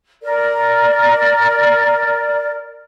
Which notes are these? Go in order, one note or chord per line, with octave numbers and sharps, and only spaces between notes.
A#4 D5